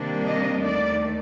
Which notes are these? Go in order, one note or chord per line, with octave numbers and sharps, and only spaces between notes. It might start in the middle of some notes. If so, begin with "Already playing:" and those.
Already playing: C3 D#3 G3 A#3 D4
D#5
D#2 D#3 A3 D5